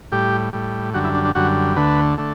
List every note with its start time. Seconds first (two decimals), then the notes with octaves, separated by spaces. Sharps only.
0.12 A2 G3 G4
0.53 A2 G3
0.94 F#2 D3 G3 F#4
1.04 E4
1.15 D4
1.25 D4
1.35 F#2 D3 G3 F#4
1.76 D2 D3 A3 B4
2.18 D3 A3